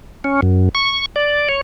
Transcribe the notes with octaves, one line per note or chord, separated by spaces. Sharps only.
C#4
F#2
C#6
D5
C#5